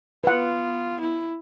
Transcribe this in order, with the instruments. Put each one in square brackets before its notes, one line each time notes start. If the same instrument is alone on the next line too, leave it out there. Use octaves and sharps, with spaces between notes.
[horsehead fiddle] B3 F4 [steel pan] B4 F#5
[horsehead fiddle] E4